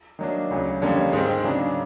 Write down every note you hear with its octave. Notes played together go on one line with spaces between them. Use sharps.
D#3 F#3 A#3 D4
D2 C#3 F#3
F2 D3 G3 A#3 C#4
G#2 D#3 G#3 C4
C#3 F#3 A#3 D4